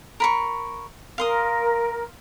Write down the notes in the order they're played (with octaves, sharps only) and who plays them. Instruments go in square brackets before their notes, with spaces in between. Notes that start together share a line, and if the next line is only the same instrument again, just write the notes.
[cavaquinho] A#4 B5 C#6
[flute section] A#4 [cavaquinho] F5 C6 D#6